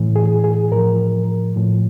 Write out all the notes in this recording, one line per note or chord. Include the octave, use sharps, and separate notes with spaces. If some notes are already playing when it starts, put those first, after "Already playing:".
Already playing: A2 E3
G#4
G#4
A2 F3 A#4
A2 F3